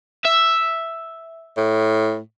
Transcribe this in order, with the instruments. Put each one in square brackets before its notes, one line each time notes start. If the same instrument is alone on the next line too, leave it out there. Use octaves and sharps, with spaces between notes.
[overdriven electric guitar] E5
[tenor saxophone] A2